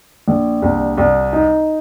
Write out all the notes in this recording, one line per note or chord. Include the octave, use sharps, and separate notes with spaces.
A#1
C2
C2
D#4